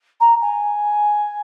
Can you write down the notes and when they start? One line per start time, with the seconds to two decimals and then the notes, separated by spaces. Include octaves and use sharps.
0.20 A#5
0.42 G#5